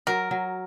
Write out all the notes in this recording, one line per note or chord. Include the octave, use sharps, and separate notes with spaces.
F#3 A#4
F#3